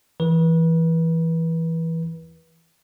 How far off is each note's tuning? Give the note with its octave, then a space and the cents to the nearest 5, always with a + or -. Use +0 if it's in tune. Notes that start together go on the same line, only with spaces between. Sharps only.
E3 +0 B4 -30